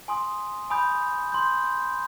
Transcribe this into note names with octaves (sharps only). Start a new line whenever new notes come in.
G#5 C6 D#6
G#5 B5 D#6 G6
C6 G6